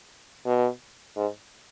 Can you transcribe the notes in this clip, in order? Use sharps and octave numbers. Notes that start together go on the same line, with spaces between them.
B2
G#2